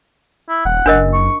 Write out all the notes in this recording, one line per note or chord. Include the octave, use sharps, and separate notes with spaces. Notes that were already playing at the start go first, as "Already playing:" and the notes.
E4
D#1 F#5
F#1 D4 A#4 D#5
C#6